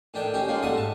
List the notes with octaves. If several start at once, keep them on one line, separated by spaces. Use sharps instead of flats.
A2 D#3 D4 G5
C#4 D#4 G4
G#3 A#3 F4
G#2 G3 A3 F#5 D#6
A5